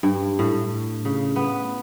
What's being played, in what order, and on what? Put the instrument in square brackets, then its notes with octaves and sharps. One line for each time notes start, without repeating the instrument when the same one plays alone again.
[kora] G2
A2
C#3
B3